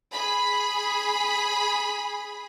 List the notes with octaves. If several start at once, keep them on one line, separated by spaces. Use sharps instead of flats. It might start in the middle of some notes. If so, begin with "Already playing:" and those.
G#4 B5